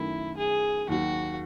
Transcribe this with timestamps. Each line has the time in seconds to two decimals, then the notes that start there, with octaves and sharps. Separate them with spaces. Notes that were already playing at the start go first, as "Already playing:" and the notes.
Already playing: F#2 D#3 A3 E4
0.37 G#4
0.89 D#2 D#3 F#3 F#4